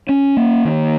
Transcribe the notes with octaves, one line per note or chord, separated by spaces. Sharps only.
C#4
A#3
D#3